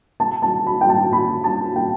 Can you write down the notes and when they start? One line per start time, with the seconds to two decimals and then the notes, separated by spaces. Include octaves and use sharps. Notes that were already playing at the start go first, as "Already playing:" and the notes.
0.20 A5
0.42 A5
0.67 B5
0.81 G5
0.89 A5
1.13 B5
1.44 A5
1.76 G5